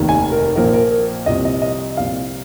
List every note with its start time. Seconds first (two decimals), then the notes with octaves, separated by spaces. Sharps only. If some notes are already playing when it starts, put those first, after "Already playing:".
Already playing: F1 D#2 D#3
0.09 G#5
0.32 A#4
0.56 A#1 A#2 F3 A#4
0.73 A#4
0.91 A#4
1.26 C2 C3 F3 D#5
1.45 D#5
1.62 D#5
1.97 C2 A#2 F3 F5